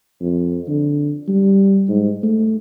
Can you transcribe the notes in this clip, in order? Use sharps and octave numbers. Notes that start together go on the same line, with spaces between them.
F2
D3
G3
G#2
A3